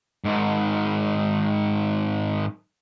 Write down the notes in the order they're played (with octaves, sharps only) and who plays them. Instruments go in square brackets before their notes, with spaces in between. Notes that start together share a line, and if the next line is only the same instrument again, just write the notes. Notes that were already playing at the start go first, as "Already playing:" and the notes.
[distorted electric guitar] G#2 D#3